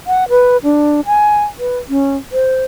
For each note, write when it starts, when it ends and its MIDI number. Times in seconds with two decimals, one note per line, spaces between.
0.07 0.28 78
0.29 0.57 71
0.63 1.01 62
1.06 1.44 80
1.59 1.78 71
1.89 2.16 61
2.32 2.65 72